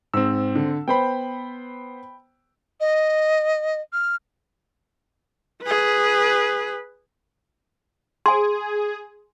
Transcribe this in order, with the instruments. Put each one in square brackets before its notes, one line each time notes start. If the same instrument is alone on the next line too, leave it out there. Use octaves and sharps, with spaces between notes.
[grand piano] G#2 [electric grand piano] C4 E6
[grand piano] D3
[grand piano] B3 C5 [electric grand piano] G5 B5
[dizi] D#5
F6
[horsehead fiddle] G#4 B4
[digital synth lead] G#4 [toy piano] G#5 C6